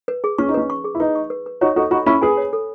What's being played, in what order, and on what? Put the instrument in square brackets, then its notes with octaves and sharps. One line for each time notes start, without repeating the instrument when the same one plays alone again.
[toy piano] B4
G#4
[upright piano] C#4 [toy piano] C#6
[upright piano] D#4
[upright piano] C#4 [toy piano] B4
[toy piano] C#6
G#4
[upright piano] E4
[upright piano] D#4 [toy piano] B4
[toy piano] C#6
B4
B4
[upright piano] D#4 F#4 [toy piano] C#5
[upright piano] D#4 F#4 [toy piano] A4
[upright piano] D#4 F#4 [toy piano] B5
[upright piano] C#4 E4 [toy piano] B5
[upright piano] G#4 B4 [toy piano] G#5
[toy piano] C#5
A4